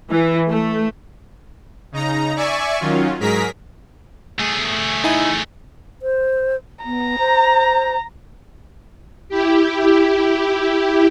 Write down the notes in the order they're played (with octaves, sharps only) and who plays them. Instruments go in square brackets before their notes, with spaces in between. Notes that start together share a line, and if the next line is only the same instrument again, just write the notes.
[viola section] E3
A3
[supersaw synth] C#3 D#4 A#5
D5 E5 G#5 C#6
D#3 F#3 C#4 F4
G#2 F#3 G#4 A#4 A#5 B6
[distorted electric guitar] A3 G#4
[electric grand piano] D#4 E4 G#5
[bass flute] C5
[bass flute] B3 [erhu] A#5
[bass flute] C5
[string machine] E4 G4